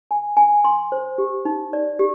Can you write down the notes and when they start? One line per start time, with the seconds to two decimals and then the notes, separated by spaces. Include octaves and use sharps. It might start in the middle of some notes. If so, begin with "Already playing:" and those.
0.11 G#5
0.37 G#5
0.64 C6
0.92 C5
1.18 G4
1.45 D#4
1.73 D5
1.99 G4